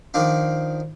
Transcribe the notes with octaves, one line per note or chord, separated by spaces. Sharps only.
D#3 F3 D4